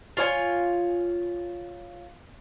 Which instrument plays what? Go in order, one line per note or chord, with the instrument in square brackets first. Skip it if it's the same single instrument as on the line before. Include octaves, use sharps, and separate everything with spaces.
[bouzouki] F4 C#5 G#5